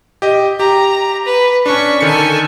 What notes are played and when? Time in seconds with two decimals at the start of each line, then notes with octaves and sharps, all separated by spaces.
0.22 G4 D#5
0.60 G4 A#5
1.26 B4
1.66 C#4 D4 C#6 B6
2.01 D3 D#3 A4 G#5 C#7